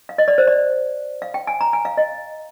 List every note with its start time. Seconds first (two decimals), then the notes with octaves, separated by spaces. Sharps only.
0.09 F5
0.18 D#5
0.28 D5
0.38 C5
0.47 D5
1.22 F5
1.34 G5
1.47 G#5
1.61 A#5
1.73 G#5
1.85 F5
1.97 D#5